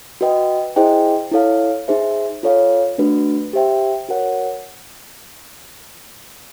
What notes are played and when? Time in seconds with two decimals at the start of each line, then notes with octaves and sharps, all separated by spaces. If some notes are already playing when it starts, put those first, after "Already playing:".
0.21 F#4 B4 D#5 G5
0.76 E4 G#4 C5 D#5 G5
1.32 E4 A4 C#5 F5
1.88 D#4 G#4 C5 E5
2.43 F4 A4 C#5 F5
2.98 A3 D4 F#4 B4
3.53 G4 C5 E5 G5
4.09 F#4 A#4 C#5 F#5